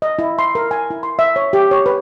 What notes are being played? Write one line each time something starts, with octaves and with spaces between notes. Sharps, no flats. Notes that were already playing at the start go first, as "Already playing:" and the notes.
D#5
E4
C6
A#4
G#5
E4
C6
E5
C#5
G4
C#5
B4